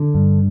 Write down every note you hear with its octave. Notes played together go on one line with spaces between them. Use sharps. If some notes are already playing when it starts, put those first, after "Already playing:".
Already playing: D3
G2